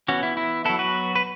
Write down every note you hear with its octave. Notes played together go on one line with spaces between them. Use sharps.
E3 B3 C#4 F#4
E4
E4
F#3 B3 E4 A4
F#4 B4
B4